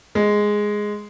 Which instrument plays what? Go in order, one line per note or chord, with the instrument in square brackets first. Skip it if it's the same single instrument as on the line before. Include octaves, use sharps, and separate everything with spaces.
[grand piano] G#3